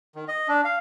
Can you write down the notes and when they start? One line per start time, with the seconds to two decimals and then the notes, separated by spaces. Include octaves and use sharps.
0.15 D#3
0.28 D#5
0.48 D4
0.65 F5